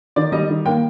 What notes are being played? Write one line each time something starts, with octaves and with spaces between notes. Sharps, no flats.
D#3 D5
G3 D#5
D#3
A#3 G5